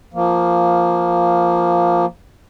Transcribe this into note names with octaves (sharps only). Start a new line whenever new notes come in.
F3 A#3